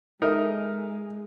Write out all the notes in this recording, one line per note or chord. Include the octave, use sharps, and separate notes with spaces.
G#3 D#4 A4 A#4 E5